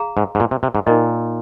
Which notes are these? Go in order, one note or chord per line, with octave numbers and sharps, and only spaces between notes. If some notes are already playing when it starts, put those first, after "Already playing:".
Already playing: G#4 F5 A#5
G#2
G#2
A#2
C3
C3
G#2
A#2 D#4 A#4 D#5